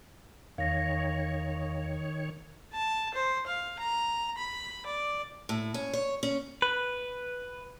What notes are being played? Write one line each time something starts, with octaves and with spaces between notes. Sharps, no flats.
E2 D#3 C#5 F5 A#6
A5
C5
F5
A#5
B5
D5
A2
C#4
C#5
C#4
B4